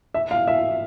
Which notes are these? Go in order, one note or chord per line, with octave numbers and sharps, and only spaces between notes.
E5
F5
E5